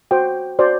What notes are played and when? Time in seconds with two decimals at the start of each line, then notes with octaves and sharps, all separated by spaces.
0.11 F#4 C5 G5
0.59 F#4 C5 D5